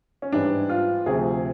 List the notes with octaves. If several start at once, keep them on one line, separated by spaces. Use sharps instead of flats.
C#4
G#2 E3 G3 D4
F4
D2 C3 F3 G#4